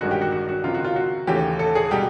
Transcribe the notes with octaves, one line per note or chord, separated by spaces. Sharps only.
A1 G2 D#3 G#3 F#4
G4
F#4
F#4
F#4
C#2 C3 D#3 F#3 F4
F#4
F4
F#4
D#2 C#3 E3 A3 G4
A4
G#4
B2 G3 G4